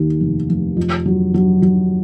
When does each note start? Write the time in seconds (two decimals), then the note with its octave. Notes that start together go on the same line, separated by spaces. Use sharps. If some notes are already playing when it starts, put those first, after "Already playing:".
Already playing: D#2 D#3
0.21 F1
0.49 F1
0.77 F2
1.06 F#3
1.34 F#3
1.62 F#3